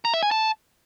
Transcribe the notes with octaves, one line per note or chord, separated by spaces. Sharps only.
A#5
E5
G#5
A5